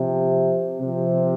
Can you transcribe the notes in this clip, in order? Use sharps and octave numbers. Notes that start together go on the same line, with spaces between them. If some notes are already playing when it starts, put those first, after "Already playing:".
Already playing: C3 F3
C3 F3